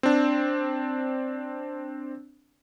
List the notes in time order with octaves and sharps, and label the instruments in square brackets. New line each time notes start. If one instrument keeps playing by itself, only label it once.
[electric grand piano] C4 D4